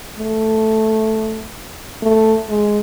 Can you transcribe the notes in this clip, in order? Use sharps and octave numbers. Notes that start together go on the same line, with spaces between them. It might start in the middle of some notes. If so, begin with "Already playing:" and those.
A3
A3
G#3